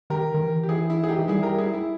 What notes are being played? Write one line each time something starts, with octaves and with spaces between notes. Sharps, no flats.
D#3 G4 A#4
D#3
E3
G4
E4 G#4
E4
G#4
D#4 G4
E3
G3 E4 G#4
G4 A#4
E4 G#4
E4